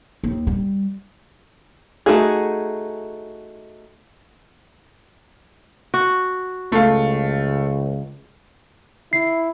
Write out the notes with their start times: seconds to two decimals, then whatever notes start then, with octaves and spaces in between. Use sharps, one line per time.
0.24 D#2
0.47 G3
2.06 A3 A#3 D#4 F#4 G#4
5.94 F#4
6.72 C#2 A3 F5
9.13 E4 C7